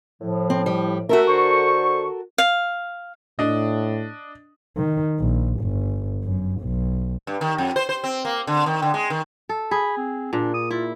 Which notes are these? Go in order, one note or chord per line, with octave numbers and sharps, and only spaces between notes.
A2 F3
C4
G3
A3 F#4 A4 A#4 E5
D3 C5 C#6
F5
A2 D4 D#5
D#3
A#1
G1
F#2
B1
G2
D#3
F2
C5
C5
C4
A#3
D3
D#3
D3
G#3
D#3
A4
G#4 B5
C4
A#2 D4
D#6
E4 F4